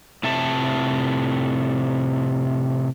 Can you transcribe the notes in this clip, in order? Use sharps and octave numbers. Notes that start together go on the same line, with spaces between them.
A2 C3 A3 A5